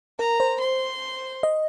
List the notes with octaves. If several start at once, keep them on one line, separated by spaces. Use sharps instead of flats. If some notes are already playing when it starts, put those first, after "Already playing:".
A#4 A#5
C5
C6
D#5